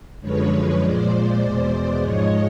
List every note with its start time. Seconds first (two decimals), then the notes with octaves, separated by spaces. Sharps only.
0.21 F#2 D3 F3 G#3 B4 C#5
0.81 A#2 F3 G#3 C5 D5
1.12 C5 D5
1.42 E2 B2 G#3
2.01 G#2 F3 G#3 C#5 D#5